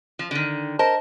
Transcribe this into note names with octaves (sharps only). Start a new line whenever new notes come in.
F3
D3 D#3
A#4 C5 D#5 A5